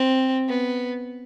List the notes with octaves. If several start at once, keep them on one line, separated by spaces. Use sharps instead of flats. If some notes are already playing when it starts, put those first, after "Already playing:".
Already playing: C4
B3